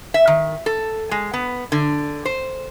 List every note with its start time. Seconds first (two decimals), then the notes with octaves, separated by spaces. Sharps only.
0.14 E5
0.27 D#3
0.66 A4
1.11 G#3
1.34 B3
1.72 D3
2.25 C5